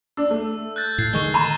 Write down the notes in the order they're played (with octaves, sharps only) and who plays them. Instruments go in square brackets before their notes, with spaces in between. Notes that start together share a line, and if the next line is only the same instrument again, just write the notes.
[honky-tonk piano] D4 [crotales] E6
[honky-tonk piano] A3
[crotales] F#6 G6 A6
[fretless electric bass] A2 [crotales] F#6 G#6 C7
[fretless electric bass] D3 D#3 G#3 [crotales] C#6 G7
[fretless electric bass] D3 [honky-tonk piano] A#5 [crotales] C#6 D#7 E7